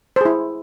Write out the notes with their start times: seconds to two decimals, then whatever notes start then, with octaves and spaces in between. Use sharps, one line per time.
0.16 C5
0.21 G#4
0.25 E4